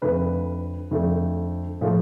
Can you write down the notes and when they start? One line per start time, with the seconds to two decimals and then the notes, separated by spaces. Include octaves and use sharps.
0.02 F2 D3 A3 B4
0.91 F2 D3 A3
1.81 A2 F3 A3